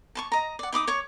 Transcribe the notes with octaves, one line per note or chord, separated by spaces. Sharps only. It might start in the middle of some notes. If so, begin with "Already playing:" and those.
A5 C6 C#6
D#5 A#5
D5 F#5
D#4 B5 D6 D#6
C#5 C#6 D6